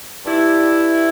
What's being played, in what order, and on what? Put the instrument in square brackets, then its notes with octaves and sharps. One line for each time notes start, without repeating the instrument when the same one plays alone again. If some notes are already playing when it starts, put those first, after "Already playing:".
[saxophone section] G2 G3 E4